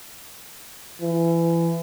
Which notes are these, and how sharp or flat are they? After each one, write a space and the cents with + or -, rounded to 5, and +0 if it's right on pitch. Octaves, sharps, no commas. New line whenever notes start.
E3 +25